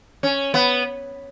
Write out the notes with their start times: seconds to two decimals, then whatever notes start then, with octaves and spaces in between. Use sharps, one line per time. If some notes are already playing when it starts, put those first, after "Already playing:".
0.23 C#4
0.54 B3